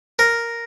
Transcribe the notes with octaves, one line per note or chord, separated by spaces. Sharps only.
A#4